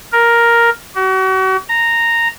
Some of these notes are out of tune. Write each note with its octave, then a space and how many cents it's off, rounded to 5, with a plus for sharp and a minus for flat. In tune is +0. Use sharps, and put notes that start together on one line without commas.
A#4 +5
F#4 +40
A#5 -10